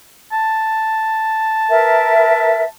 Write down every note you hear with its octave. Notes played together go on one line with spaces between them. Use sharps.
A5
A#4 B4 E5